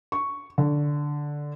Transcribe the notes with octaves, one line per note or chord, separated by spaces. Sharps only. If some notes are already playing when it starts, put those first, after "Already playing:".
C#6
D3